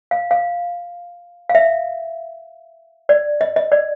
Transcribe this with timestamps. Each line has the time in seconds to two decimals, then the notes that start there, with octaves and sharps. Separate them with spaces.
0.11 F5
0.31 F5
1.49 F5
1.55 E5
3.09 D5
3.41 D#5
3.56 D#5
3.72 D5